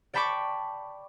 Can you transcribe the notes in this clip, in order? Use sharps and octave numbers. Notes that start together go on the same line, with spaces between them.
D5 G5 A5 B5 C#6 D6